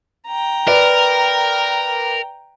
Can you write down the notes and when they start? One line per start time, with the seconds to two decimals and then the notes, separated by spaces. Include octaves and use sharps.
0.27 G5 A#5
0.67 A#4 B4 D5